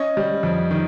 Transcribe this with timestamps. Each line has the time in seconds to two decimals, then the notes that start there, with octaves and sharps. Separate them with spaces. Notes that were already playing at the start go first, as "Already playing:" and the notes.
Already playing: C#4 D#5
0.17 G3
0.43 F2
0.71 D#3